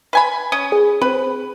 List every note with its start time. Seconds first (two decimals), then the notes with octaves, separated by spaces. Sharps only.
0.13 B4 G#5 B5
0.52 C#4 D#6
0.72 G#4
1.01 C4 B4